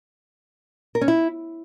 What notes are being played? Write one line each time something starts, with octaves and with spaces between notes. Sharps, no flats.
A#4
C#4
E4